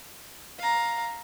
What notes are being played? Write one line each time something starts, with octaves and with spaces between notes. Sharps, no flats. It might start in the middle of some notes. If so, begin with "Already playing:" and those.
F5 A#5